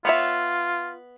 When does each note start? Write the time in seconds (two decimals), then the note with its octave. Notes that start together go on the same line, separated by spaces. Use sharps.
0.05 B3 F4 C#5 E5